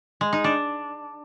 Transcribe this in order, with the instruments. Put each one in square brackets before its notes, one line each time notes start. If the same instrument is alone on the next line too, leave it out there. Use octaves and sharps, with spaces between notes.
[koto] G#3
D#4
D4